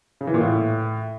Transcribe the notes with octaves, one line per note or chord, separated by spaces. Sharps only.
C#3
E3
A#2
A2